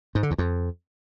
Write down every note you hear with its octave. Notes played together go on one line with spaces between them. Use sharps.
G#2
D3
E2
F2